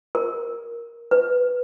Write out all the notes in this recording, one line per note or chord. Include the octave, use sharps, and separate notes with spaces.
A#4
B4